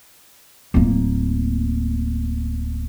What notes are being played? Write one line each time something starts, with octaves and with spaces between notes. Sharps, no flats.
D1 A#3